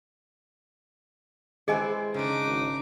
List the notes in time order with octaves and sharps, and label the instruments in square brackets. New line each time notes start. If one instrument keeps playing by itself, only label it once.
[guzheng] E3 C4 E4 [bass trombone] G#3 [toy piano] G#4 D#5 G#5
[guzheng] C#3 D4 [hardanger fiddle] D#4 D6
[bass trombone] G#1